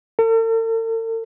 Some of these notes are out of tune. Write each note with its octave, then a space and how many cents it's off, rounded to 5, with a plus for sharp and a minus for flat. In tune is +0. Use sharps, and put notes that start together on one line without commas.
A4 +45